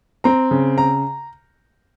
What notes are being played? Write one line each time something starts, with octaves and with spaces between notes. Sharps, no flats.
C4 A#5
C#3
A#5